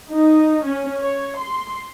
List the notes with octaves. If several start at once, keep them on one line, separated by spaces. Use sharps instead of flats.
D#4
C#4
C#5
C6